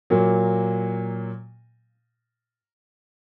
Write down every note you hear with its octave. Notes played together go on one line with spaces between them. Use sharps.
A#2 F#3 A#3